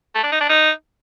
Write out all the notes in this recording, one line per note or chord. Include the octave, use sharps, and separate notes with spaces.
A3
D4
D#4
D4
D#4